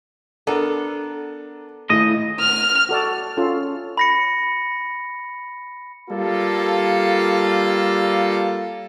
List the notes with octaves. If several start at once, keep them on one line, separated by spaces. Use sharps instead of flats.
B3 D4 A4 A#4
D#1 A3 E4 D#5
F6
F#4 A4 D5 A5
C#4 F4 A4
B5 A#6 C#7
G3 A#3 F4 A4